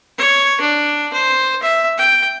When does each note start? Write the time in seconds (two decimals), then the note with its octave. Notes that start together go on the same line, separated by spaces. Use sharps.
0.18 C#5
0.61 D4
1.13 C5
1.63 E5
1.98 G5